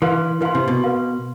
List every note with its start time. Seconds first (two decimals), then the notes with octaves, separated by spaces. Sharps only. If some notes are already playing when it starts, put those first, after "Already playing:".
0.02 E3 B4 F5 C6
0.41 E3 B4 F5 C6
0.55 C3
0.68 B2
0.81 B4 F5 C6